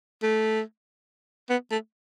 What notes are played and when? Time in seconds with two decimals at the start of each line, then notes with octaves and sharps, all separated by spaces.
0.23 A3
1.50 B3
1.71 A3